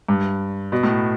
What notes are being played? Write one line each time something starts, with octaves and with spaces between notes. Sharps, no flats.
G2
B2
A2